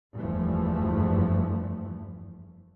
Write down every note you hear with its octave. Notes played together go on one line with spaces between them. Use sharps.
F#1 E2 G2 E3 F3 A3